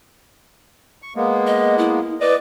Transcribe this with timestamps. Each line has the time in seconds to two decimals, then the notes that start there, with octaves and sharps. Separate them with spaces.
1.02 C#6
1.16 G#3 A#3 B3
1.47 D#5
1.78 E4
2.21 B4 D5 D#5